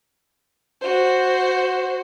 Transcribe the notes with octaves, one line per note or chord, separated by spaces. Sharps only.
F#4 C5